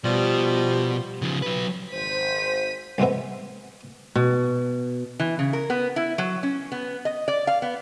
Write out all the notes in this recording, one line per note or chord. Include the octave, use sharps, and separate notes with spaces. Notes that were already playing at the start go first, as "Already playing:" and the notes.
B2 F3 G3
C#3 F3
F#3 B4
G#1 C5 B6 D#7
C2 G#2 G#3 B3 E5
B2
E3
C#3
A#4
B3
E4
F#3
C#4
B3
D#5
D5
F5
B3